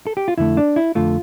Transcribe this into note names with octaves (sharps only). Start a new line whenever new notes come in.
A4
G4
F4
F2 D3 A3 E4
D4
E4
F2 D3 A3 F4